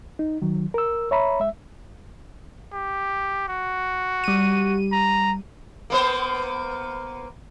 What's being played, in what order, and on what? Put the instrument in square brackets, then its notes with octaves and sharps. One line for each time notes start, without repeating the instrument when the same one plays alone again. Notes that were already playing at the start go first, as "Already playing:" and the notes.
[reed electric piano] D#4
D#3 F#3
A#4 E6
C#5 E5 A#5 B5
G#3 E5
[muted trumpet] G4
F#4
[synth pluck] G3 D#7
[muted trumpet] A#5
[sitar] A#3 B3 C5